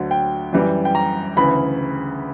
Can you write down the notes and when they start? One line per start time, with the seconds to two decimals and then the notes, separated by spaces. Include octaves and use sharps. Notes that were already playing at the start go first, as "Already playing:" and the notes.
Already playing: D2 D3 F#3
0.11 G5
0.53 F#2 E3 G3
0.85 G5
0.95 A#5
1.37 D2 C#3 E3 B5